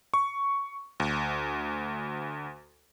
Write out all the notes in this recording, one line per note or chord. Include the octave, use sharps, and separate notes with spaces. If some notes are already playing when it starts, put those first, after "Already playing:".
C#6
D2